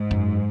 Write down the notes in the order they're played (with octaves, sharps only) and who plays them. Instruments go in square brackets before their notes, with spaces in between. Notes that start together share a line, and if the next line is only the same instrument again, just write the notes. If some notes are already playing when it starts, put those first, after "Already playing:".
Already playing: [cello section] G#2
[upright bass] F#2